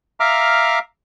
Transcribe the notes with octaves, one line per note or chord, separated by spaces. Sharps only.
E5 F5 A#5 D6 F6